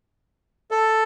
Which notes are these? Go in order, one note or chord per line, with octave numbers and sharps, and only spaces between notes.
A4